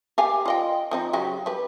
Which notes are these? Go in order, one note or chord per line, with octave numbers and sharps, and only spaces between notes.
G4 F5 G#5
F4 D#5 G5
F3 C4 D#4
C#3 F#3 G4
G3 B4